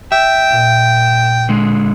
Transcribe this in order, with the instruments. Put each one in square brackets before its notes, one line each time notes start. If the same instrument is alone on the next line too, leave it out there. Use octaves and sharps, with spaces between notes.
[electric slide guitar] E5 [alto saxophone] G5
[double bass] A#2
[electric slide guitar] D3 G#3